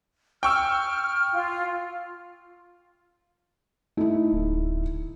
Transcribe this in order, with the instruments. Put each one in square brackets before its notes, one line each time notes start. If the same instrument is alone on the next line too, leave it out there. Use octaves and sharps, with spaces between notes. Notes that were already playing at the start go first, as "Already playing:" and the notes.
[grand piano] G5 C#6 E6 [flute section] F6
[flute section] F4
[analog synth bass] A3 [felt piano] D#4 E4
[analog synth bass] D1